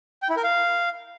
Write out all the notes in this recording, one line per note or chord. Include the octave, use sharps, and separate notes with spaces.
G5
E4
A#4
F5